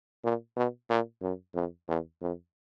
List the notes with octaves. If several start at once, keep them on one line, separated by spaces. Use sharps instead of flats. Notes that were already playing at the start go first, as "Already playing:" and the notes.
A#2
B2
A#2
F#2
F2
E2
F2